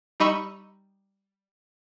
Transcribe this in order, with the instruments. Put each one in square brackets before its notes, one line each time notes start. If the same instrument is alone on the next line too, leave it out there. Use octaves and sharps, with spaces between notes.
[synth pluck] G3 D#4 D#5 B5 C#6 E6